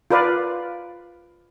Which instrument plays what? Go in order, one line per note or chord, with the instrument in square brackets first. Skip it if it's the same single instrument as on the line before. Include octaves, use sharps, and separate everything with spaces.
[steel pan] F4 A#4 B4 D5 F5